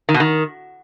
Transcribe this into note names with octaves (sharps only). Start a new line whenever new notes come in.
D#3
B2
D#3